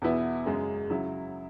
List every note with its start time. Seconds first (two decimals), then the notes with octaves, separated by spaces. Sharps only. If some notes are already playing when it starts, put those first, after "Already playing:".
0.02 E2 B2 B3 E4
0.46 F#2 C#3 G#3
0.90 C#3 F#3 E4